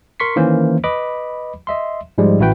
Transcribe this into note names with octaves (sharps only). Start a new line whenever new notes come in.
A#4 C6 C#6 B6 C7
D#3 E3 A#3 C#4 C5
B4 D#5 B5 D6
D#5 E5 C6
G#2 F3 G3 G#3
A1 E4 F#4 B4 G5